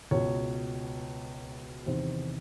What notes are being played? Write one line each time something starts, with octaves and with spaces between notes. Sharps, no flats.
C#2 B2 C#5
E2 C3 D#3 C5